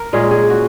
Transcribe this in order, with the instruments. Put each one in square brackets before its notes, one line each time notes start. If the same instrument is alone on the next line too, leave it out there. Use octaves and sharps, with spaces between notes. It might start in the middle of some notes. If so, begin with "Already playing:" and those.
Already playing: [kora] A#4
A#2 G#3 C#4 G#4
G#4
F#4